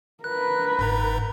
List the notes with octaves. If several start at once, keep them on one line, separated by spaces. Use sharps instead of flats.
A#4 B4 F#6
G1 G#2 A#5